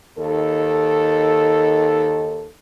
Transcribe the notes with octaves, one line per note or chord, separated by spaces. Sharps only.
D#2 D#3 A4